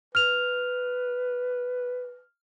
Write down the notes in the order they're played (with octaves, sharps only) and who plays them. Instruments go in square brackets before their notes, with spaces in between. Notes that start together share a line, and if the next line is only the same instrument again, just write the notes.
[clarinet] B4 [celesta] F6 F7